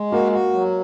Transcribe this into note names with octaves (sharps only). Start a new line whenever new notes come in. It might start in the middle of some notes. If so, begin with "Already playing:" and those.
Already playing: G#3
A#3 F#4
F#4
F#3